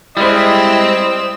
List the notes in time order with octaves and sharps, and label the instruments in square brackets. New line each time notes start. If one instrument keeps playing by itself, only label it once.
[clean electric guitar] G3 G#3 [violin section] C4 E6 [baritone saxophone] E4 [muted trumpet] D#5